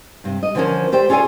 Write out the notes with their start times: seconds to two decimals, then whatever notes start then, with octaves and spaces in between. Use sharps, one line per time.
0.24 G2 C3
0.43 D#5
0.55 D3 E3 F3 C#4 A#4 C5
0.92 G4 A4 C5 D5 G5
1.09 C#4 F4 G#4 A4 D5 G#5